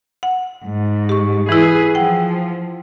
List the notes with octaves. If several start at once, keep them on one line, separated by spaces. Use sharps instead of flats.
F#5
G#2
G4 C#6
E3 E4 G#4 B4
F3 F#5 G5